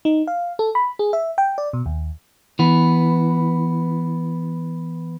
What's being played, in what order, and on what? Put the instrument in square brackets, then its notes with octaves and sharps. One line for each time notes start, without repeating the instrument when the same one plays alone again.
[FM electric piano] D#4
F5
A4
B5
G#4
E5
G5
D5
B2
D#2
[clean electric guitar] E3 B3